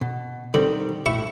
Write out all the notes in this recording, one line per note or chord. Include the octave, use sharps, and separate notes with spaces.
B2
D3 D#3 G3 C4
A2 E4 E5 C#6